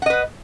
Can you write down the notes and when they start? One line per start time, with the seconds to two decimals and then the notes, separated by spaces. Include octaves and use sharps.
0.02 F#5
0.06 D#5
0.10 B4